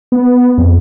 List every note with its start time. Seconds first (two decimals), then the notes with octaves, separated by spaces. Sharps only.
0.12 B3
0.58 F2